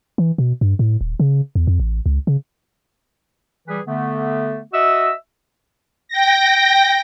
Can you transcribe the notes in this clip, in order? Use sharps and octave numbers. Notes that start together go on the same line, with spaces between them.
E3
B2
G2
A2
D#1
C#3
E2
F2
A1
C#2
C#3
E3 G3 G#4 B4
D3 A3 B3
F#4 D#5 E5 E6
G5 A#6